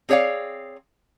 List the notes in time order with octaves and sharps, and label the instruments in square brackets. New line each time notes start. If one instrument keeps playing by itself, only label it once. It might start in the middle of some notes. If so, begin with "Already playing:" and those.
[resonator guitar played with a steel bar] C4 G#4 C#5 D5 F5